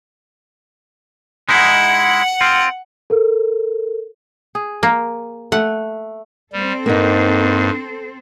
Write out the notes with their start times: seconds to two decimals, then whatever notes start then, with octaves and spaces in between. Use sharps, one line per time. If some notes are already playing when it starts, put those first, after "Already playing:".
1.49 G#3 D#4 E4 F#5
2.41 C4 F4
3.10 A4 A#4
4.55 G#4
4.83 A#3
5.52 A3 F#5
6.53 G3 C4 A4
6.86 G2 A#3 B3 D#4